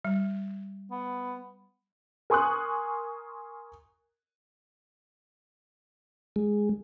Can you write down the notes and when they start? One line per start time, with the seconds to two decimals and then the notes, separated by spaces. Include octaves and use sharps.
0.05 G3
0.91 B3
2.30 A#4 G#5 C6 C#6 D#6 F#6
6.36 G#3